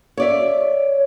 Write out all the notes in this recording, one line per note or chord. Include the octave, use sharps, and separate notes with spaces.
C#5 D5 E5